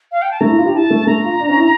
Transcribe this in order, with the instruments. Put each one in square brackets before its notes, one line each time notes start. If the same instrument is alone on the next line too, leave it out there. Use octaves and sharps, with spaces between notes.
[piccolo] F5
G5
A5
[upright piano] A3 [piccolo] A#5
[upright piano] E4
F4
G4
[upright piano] E4 [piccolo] A5
[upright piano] A3
[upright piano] A3 [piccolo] A#5
[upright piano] F4
D4
C#4
E4